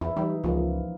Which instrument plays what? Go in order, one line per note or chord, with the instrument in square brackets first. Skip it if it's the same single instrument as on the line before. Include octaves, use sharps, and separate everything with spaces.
[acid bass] E2 [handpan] E4
[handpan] E3 D#4 [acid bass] G3
[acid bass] C#2 [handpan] F3 A#3